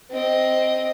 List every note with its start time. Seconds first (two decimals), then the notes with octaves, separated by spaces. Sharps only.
0.11 C4 D#5